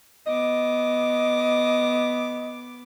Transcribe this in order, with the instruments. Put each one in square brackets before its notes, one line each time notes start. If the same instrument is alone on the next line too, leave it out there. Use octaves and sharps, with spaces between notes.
[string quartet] B3 D6 [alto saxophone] D#5